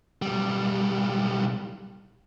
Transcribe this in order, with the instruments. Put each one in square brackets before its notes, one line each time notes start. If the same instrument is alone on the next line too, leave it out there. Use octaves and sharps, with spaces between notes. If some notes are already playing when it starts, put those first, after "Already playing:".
[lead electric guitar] B1 G3